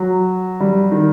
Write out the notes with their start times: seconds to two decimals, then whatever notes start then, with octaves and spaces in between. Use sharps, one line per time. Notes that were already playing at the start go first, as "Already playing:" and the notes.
Already playing: F#3
0.60 G3
0.92 D#3